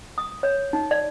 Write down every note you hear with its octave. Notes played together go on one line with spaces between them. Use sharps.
D#6
C#5
D#4
D5